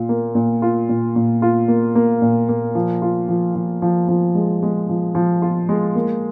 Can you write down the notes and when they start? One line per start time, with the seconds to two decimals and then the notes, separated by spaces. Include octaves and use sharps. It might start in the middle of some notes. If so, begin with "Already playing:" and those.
Already playing: A#2 F4
0.09 A#3
0.35 A#2
0.62 F4
0.89 A#2
1.16 A#2
1.42 F4
1.68 A#3
1.95 A#3
2.22 A#2
2.49 A#3
2.75 F3
3.02 F4
3.28 F3
3.55 F3
3.82 F3
4.09 F3
4.35 G#3
4.63 G#3
4.89 F3
5.15 F3
5.42 F4
5.69 G#3
5.95 A#3